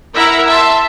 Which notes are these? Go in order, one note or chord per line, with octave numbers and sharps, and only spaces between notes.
E4 A#4 E5 F#5 A#5
E5 A5 C6